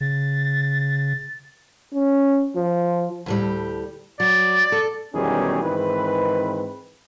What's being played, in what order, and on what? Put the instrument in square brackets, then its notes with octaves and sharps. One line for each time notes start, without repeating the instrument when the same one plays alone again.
[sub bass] C#3 [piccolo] A6
[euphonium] C#4
F3
[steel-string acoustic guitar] D2 A2 G3
[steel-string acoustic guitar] F#3 [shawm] D5
[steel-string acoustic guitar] A4
[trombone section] B1 E2 D#3 G3 C#4 G#4
G#2 D#3 E3 C4 B4